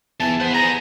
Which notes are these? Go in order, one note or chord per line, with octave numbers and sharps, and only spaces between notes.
E2 E3 A5
B4 C5 F#5
B3 G#4 A#5